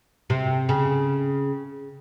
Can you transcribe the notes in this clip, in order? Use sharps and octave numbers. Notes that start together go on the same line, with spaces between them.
C3
C#3